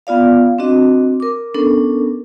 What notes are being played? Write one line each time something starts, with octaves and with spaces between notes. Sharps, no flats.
B3 F4 D5 F5
C4 D4 F#4 D#5
A#4 D6
B3 C#4 D4 A4 A#4